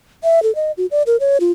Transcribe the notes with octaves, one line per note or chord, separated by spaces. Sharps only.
E5
A4
D#5
F#4
D5
A#4
C#5
F4